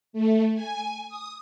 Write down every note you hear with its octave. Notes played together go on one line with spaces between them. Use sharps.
A3
G#5
D#6